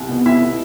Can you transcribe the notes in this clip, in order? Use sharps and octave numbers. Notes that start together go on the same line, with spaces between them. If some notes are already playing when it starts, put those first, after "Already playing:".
Already playing: C2
B2 B3
C2 E4 E5
B2 B3